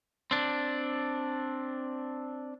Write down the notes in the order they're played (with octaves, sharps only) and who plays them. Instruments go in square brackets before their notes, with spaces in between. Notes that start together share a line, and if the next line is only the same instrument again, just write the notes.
[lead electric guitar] C4 D4